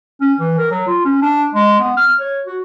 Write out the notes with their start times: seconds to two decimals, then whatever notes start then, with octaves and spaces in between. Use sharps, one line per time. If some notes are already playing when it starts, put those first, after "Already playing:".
0.21 C#4
0.39 E3
0.58 A#4
0.71 F#3
0.87 F4
1.05 C#4
1.22 D4
1.54 G#3
1.80 B3
1.97 F6
2.20 C#5
2.47 F#4